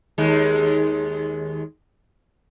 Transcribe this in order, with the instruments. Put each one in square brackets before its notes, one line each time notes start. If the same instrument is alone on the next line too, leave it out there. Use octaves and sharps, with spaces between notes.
[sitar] D#2 G#3